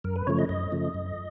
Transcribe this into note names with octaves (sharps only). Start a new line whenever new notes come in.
F#2 A#4
B4
C#3 F3 A3 C#5
D#5
F#2 D#5
C#3 F3 A3
F#2